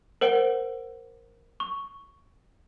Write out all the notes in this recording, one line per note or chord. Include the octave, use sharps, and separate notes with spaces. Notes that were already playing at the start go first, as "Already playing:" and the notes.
A#4 C5 F#5 D7 G7
C#6